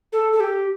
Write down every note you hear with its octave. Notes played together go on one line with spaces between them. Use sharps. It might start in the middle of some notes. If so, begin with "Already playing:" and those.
A4
A4
G4